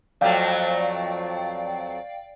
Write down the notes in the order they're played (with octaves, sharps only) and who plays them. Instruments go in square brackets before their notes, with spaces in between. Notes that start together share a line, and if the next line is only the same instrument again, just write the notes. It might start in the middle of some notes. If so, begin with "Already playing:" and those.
[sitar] F2 F#3 A3 [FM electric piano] D5 F5 G5